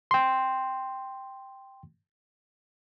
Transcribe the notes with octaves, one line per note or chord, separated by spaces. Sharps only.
G5 C6